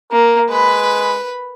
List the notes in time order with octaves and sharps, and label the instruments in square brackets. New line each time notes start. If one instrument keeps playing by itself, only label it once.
[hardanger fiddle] A#3 [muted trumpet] A#4
[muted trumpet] G#3 [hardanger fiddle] B4 B5